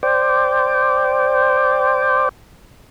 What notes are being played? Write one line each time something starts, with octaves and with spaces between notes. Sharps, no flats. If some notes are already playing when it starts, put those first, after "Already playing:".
C5 D5 G5